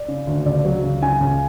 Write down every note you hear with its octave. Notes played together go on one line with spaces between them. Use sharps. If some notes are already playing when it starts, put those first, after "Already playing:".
Already playing: D5
C#3
D2
C#2 D5
F#3
C#2
C#3 G#5
C#2